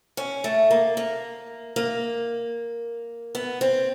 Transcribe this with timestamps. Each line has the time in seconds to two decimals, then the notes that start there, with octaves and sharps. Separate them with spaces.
0.17 C#4
0.44 A3
0.71 A#3
0.97 A#3
1.76 A#3
3.35 B3
3.61 C4